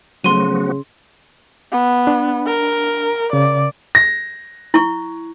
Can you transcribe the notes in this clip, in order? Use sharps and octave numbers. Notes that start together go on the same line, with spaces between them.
C#3 F3 F#3 A3 B3 F#4 C6 D#7
B3
D4
A#4
C#3 D5
A#6
E4 C#6